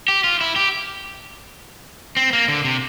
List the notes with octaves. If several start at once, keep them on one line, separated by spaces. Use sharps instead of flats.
G4
F4
E4
G4
C4
A#3
D3
C3